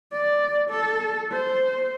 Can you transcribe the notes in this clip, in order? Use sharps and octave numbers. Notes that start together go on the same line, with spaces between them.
D5
A4
C5